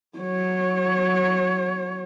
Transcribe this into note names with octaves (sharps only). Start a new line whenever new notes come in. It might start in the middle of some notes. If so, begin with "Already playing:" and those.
F#3 C#5